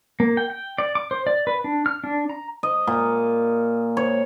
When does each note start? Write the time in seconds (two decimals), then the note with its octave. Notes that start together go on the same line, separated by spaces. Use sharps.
0.20 A#3
0.37 G5
0.50 G5
0.78 D5
0.95 D6
1.11 C5
1.27 D5
1.47 B4
1.64 D4
1.86 F6
2.04 D4
2.29 A#5
2.63 D#5
2.87 A#2
3.97 C#5